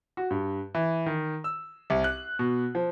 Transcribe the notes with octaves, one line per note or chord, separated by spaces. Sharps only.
F#4
G2
E3
D#3
E6
C2
F#6
B2
F3